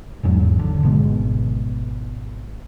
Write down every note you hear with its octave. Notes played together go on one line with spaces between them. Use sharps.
G#1 E2 G#2 F#3
D3
G#1 B2 G#3